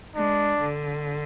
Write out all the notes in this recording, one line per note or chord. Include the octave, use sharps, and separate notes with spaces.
G#3 D4
D3